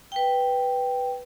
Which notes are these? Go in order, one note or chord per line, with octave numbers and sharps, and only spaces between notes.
B4 G5